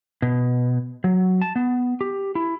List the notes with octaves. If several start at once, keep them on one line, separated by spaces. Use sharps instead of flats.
B2
F#3
A5
B3
G4
E4